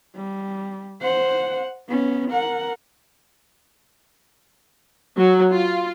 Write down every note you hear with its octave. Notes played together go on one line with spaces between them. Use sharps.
G3
C5 F#5
B3 C#4
A#4 F#5
F#3
F4